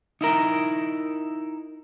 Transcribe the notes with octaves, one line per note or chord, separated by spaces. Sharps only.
D#4 E4 A#4